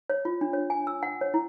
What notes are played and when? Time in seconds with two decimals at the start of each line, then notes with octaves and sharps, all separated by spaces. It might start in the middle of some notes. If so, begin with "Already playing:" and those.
0.10 C#5
0.25 F4
0.41 D4
0.53 C#5
0.70 G#5
0.87 E6
1.03 F#5
1.21 C#5
1.34 E4